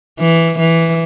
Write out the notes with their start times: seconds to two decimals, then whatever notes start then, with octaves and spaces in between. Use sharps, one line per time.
0.19 E3
0.59 E3